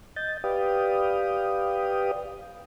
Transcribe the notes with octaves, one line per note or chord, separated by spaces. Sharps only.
D#5 G6 A6
G4 B4 D5 F5 G5 D#6